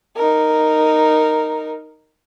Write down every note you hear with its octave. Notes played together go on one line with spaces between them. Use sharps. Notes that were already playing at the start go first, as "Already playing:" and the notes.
D#4 A#4